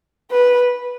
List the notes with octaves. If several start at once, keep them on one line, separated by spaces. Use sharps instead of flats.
B4